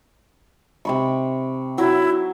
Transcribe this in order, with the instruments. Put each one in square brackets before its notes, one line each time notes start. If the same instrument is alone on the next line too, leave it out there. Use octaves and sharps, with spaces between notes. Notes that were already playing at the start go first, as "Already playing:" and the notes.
[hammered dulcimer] C3 B5 C#6
[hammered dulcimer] F#3 [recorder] E4